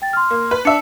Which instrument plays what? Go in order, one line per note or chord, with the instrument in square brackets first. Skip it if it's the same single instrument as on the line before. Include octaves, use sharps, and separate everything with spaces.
[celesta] G5 A6
C6 F6
[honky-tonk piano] A#3
B4
[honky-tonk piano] D4 E5 [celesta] C#7